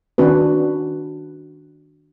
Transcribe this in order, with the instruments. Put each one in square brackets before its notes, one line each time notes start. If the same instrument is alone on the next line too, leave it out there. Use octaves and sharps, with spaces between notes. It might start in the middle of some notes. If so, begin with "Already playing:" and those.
[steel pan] D#3 C#4 D4 F#4 B4